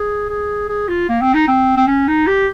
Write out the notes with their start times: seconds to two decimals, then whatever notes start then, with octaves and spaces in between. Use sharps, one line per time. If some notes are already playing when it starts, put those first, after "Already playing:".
Already playing: G#4
0.29 G#4
0.69 G#4
0.88 F4
1.09 A#3
1.21 C4
1.34 D#4
1.48 C4
1.77 C4
1.87 C#4
2.08 D#4
2.27 G4